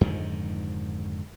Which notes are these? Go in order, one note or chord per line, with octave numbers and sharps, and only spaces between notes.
F2 G#2 D3 D#3